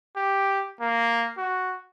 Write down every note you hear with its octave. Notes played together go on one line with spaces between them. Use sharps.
G4
A#3
F#4